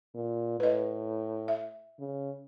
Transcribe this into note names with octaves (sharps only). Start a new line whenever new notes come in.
A#2
A2 B4 D#5
E5
C#3